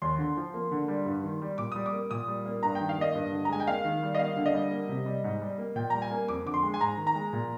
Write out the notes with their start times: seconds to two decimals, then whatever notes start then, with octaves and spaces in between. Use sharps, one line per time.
0.02 D#2 C6
0.19 D3
0.37 F3
0.54 A#3
0.71 D3
0.88 G3
1.06 G2
1.23 D#3
1.41 G3
1.58 A#2 D6
1.72 G3 D#6
1.86 D6
1.93 A#3
2.11 A#2 D#6
2.28 G3
2.45 A#3
2.63 G2 A#5
2.75 D#3 G5
2.89 F5
2.97 A#3 D#5
3.15 G2
3.32 D3
3.45 A#5
3.50 G#3 G#5
3.60 G5
3.67 A#3 F5
3.84 D#3
4.03 G3
4.15 D#5
4.19 A#3 F5
4.37 D3
4.46 D#5
4.54 G3
4.71 A#3
4.89 C3
5.06 G3
5.24 G#2
5.41 G3
5.58 A#3
5.76 A#2 G5
5.90 G3 A#5
6.02 G#5
6.11 A#3
6.28 F2 D6
6.46 D3 D6
6.54 C6
6.63 G#3
6.74 G#5
6.80 G#2 A#5
6.97 D#3
7.07 A#5
7.15 G#3
7.33 A#2